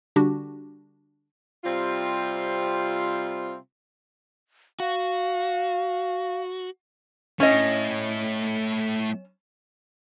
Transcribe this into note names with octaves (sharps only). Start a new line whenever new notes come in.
D3 G3 D4 F#4 G4
C3 G3 C4 F4
F#4 F5
A3 C#4 E4 D#5